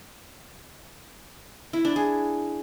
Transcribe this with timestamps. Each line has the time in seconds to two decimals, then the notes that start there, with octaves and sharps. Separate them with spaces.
1.73 E4
1.85 D4
1.96 G#4